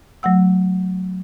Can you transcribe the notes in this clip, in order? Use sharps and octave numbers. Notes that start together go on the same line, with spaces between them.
F#3 A3 F#5 E6